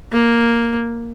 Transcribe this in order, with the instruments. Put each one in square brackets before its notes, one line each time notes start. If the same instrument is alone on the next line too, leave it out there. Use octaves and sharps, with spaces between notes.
[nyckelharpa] A#3